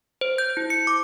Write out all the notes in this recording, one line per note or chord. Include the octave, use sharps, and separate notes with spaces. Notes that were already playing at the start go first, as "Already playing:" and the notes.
C5
G6
E4
C#7
D6